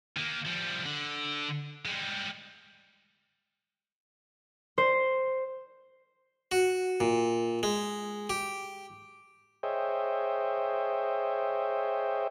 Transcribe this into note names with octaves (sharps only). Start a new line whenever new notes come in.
D#3 A#3
F3 G3
D3
G3 G#3
C5
F#4
A#2
G#3
G4
G#4 C5 C#5 D#5 E5 G5